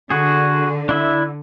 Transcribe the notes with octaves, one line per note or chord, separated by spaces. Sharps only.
D3 F#4 G#4
D4 E4 E5